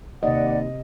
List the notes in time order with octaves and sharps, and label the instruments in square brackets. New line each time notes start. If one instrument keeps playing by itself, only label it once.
[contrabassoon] D#2 [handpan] C3 D#5 [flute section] D5 F#5